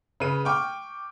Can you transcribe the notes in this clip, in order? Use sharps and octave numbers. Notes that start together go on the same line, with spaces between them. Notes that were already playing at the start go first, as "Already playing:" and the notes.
C#3 B4 D#7
G5 C#6 D6 F6